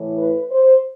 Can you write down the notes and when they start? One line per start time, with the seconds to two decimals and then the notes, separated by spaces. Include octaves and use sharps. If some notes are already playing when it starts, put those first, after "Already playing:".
Already playing: A2 E3
0.17 B4
0.50 C5